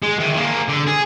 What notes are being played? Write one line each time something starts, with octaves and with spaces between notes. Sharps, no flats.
G#3
D#3 E3
A#3 G#4
D3
G#4